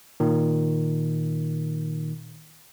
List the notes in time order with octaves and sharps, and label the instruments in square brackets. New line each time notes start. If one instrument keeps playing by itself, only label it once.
[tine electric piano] A#2 D#3